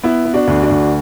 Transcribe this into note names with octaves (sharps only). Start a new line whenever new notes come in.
B3 E4
B3
D4 F#4
D2
D4 F#4
D2